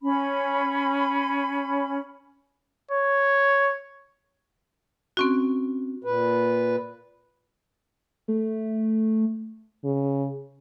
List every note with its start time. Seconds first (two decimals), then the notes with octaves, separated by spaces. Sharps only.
0.02 C#4 B5
2.91 C#5
5.17 C4 C#4 F#4
6.04 A#2 B4
8.28 A3
9.84 C#3